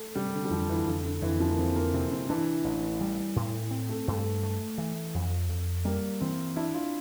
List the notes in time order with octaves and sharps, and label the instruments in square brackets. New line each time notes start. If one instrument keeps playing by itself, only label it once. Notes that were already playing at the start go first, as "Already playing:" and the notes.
Already playing: [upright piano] A3
[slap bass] C3 [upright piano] G3
[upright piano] D3
G3
[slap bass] F2 [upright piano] F3
[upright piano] E3
[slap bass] F2 [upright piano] D3
[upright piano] D3
[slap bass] F2 [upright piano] E3
[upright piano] F3
A#3
[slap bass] F3 [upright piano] C4
[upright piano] A#3
[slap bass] C3 [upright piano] C4
[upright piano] C4
[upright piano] E3 [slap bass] D4
[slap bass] A1
G3
A2
C4
[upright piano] A3
[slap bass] G2 [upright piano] A3
[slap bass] A3
E3
F2
F2
[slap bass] G3 [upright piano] A#3
[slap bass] E3 [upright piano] C4
[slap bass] D4 [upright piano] E4
[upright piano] F4